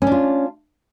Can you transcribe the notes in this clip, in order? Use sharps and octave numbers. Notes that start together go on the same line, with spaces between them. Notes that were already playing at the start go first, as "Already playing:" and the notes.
C#4 D4 F4